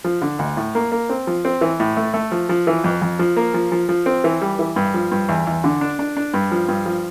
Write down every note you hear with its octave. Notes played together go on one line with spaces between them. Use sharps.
F3
D3
D2
A2
A#3
A#3
C4
F3
C4
E3
A2
A3
A3
F3
F3
E3
F2
F2
F3
A#3
F3
F3
F3
C4
E3
G3
E3
G2
F3
G2
E2
E2
D3
D4
D4
D4
G2
F3
G2
F3